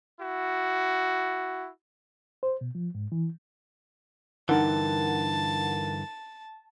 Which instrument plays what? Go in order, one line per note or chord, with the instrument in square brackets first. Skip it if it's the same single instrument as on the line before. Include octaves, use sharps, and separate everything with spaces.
[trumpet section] E4 F#4
[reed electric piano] C5
B2
F3
G#2
E3
[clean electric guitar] G2 D3 E3 [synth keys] D#4 A#4 F#5 [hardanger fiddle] A5